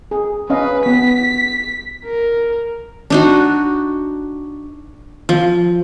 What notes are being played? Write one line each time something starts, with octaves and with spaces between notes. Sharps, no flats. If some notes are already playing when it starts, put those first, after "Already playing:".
G#4
C#4 B4 D#5 F5
B3 B6
A#4
D4 D#4 F#4
F3